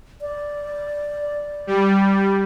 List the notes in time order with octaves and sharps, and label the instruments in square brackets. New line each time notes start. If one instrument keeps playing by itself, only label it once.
[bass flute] D5
[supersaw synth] G3